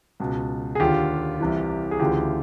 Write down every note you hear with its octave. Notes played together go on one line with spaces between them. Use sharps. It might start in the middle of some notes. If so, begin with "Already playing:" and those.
C#2 B2
G#4
D#2 D3 F4 G4
C2 C3 E3
G#4
D2 C#3 E3 F4 G4